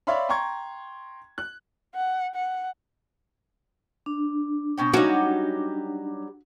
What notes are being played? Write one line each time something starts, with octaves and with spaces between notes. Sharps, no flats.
C#5 D5 E5 F5 B5 C6
G5 A#5 C6 C#6 G#6
F#6
F#5
F#5
D4
B2 C#4 G5
F#3 G3 C#4 D#4 F#4 G4